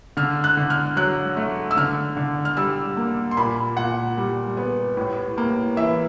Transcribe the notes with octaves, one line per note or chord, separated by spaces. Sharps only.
D3 F6
F#6
D3
F6
F#3 F#6
A3
E6
D3 F6
D3
F6
G3 E6
A#3
C6
A#2 B5
A#2 F#5
G3
B3
A2
A#3
E3 E5